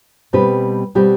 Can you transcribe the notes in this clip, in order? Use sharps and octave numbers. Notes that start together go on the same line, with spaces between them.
B2 G3 C4 G4 B4
B2 G3 C4 G4 B4